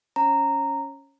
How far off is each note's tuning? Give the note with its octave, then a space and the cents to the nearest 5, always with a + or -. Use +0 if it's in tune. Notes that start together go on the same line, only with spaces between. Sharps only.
C#4 +0 C#5 -30 A#5 -10